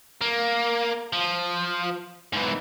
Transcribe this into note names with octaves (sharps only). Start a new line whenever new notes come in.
A#3
F3
G#2 E3